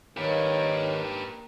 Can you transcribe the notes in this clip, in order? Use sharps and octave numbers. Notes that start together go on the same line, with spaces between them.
D#3 A#3 D#4 G4 B4 C#5